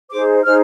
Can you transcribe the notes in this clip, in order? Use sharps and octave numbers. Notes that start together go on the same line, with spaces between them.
D#4 G#4 C5 D6
D#4 G#4 C5 F6